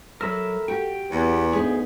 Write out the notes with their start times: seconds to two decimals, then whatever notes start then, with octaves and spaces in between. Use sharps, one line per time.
0.21 F#3 A4 A#4 E5 B5
0.68 F#4 G4 G5
1.11 E2 B3
1.53 D2 B3 D4 D#4 G#4